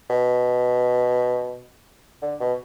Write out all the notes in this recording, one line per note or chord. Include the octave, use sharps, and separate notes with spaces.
B2
D3
B2